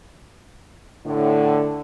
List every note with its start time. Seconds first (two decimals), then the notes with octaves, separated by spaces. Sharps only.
1.06 A2 D3